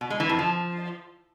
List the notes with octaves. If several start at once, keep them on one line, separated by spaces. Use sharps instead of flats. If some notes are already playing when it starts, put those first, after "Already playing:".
B2
G#3
E3
F2
F3